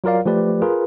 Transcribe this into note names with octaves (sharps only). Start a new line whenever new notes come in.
F#3 F4 A#4 D5 F5
F3 A3 G4 B4 D5
F4 G#4 A#4 B4